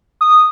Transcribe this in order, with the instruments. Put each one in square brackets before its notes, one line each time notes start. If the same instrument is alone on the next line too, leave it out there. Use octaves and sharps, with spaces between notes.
[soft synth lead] D#6